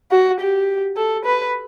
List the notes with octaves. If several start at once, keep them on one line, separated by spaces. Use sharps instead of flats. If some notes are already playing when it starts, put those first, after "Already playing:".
F#4
G4
A4
B4